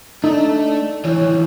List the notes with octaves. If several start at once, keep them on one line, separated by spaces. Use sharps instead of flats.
A3 D4 D#4
E3 F3 C#5